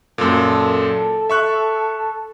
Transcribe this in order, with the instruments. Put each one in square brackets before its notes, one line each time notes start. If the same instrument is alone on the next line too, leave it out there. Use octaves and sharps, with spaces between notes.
[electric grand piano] F#2 A#2 [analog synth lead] A4
[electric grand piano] E5 C#6 F#6